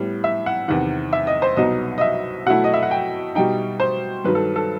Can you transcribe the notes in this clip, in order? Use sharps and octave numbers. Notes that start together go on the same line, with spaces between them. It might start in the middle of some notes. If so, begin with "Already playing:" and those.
Already playing: A2 G3 B3
E5
F#5
E2 C3 D#3 F#5
E5
D#5
C5
C2 B2 F#3 B3 D#4 D#5
D#5
E5
B2 F#3 A3 E4 F#5
D#5
E5
F#5
G5
B2 G3 D#4 G5
C5
G2 D#3 F#3 B4
A4
A4